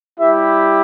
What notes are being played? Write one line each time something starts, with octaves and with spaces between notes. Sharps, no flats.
G3 E4 G4 E5